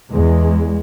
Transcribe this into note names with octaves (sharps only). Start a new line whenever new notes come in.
E2 G#3